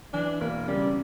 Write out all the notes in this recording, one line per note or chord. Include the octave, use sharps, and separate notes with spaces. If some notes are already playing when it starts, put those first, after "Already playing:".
E3 D4
E1 A#3
C#3 G3